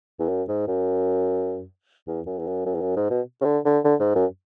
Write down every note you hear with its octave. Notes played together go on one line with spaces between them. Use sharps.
E2
F#2
G#2
F#2
E2
F#2
E2
F#2
F#2
E2
F#2
G#2
B2
C#3
D3
D3
D3
G#2
F#2